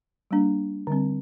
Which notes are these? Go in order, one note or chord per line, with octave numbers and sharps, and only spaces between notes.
G3 A#3 D4
D3 G3 C4